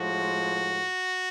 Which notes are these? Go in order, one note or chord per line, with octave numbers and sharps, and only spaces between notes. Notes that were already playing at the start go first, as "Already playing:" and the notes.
Already playing: A2 F3 G#3 F#4